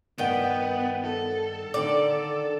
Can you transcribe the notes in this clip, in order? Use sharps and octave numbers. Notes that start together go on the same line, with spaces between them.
G2 D#3 B3 D5 F#5 G5
A4
D3 D#3 D5